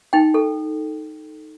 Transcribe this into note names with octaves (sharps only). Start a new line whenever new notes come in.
D#4 G5
A4